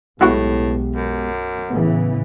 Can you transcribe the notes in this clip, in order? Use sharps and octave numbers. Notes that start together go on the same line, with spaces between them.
B1 A2 G#3 B3 E4 F#4 G4
F#2
A2 C#3 E3 B3